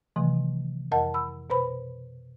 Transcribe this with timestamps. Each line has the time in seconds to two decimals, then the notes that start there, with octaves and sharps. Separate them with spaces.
0.16 C3 D#3 E3 F#3 A3
0.92 F2 A#4 D#5 F#5 A5
1.14 B5 E6
1.50 B2 B4 C5 B5